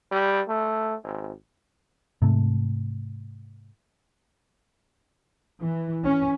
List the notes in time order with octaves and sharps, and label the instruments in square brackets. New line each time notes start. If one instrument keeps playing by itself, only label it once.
[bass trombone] G3
A3
G#1
[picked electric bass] G#2 C3 A3
[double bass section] E3
C#4